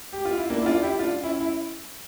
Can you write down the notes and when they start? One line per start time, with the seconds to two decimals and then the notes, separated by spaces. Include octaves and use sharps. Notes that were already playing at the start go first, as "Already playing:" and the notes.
0.13 G4
0.25 F4
0.38 E4
0.50 A#3 D4
0.62 E4
0.66 D4 F4
0.83 E4 G4
0.99 D4 F4
1.23 C#4 E4
1.40 E4